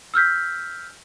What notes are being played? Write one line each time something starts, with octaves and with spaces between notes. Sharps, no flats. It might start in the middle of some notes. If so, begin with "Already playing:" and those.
E6 F6 G6 B6